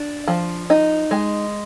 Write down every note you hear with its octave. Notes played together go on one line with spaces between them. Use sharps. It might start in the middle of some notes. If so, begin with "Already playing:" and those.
Already playing: D4
F3
D#4
G#3